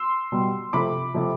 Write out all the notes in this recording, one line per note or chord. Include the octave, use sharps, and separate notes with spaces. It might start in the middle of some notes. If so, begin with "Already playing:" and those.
Already playing: C6 E6
B2 G3
C3 F3 A3 B5 D6
C3 F3 A3